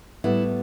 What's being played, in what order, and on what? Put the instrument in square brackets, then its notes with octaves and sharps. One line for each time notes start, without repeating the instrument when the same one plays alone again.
[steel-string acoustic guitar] A2 G3 B3 E4